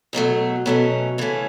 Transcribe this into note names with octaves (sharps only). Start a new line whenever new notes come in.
E2 B2 F#3 A3
B2 F#3 A3 C#4
C#3 E3 A3 C#4